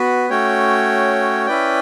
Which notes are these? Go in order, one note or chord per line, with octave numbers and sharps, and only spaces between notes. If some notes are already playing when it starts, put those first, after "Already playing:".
Already playing: B3 F#4 B4
A3 C#4 F#4 C#5 G5
C#4 E4 B4 D5 G5